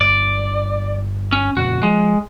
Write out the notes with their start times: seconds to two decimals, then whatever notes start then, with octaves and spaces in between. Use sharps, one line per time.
0.01 G1 D5
1.32 C#4
1.57 F2 A#2 C#3 F#4
1.83 F3 G#3